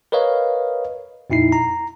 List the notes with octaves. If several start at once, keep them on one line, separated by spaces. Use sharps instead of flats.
A#4 B4 C#5 D#5 F5
F2 A#2 D#4 E4 C7
A#5